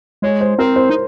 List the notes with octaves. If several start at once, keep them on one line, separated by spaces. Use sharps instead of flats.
G#3 C#5
C5
C4 A#4
C5
D#4